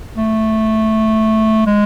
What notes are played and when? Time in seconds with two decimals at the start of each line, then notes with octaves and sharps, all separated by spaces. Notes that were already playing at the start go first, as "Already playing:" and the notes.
0.16 A3
1.67 G#3